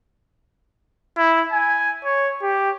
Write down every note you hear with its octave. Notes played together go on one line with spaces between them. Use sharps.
E4
G#5
C#5
G4